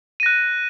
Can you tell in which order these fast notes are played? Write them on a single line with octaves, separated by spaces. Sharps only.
D#7 A#6 F#6